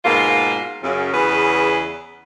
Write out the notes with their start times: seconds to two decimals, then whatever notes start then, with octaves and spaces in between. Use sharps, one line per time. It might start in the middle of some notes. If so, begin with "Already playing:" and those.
0.05 G#2 B2 A#3 F4
0.82 F#2 C#3
1.12 E2 C#3 B4